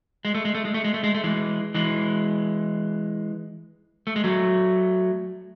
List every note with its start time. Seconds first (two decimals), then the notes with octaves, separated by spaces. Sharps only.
0.25 G#3
0.35 A3
0.45 G#3
0.55 A3
0.65 G#3
0.74 A3
0.84 G#3
0.94 A3
1.04 G#3
1.14 A3
1.24 E3 G#3
1.74 E3 G#3
4.07 A3
4.16 G#3
4.24 F#3 A3